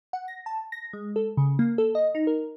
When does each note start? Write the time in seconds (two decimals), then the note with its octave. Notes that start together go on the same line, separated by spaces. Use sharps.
0.13 F#5
0.28 A#6
0.46 A5
0.72 A#6
0.93 G#3
1.16 A4
1.37 C#3
1.59 A#3
1.78 A4
1.95 D#5
2.15 D#4
2.27 A#4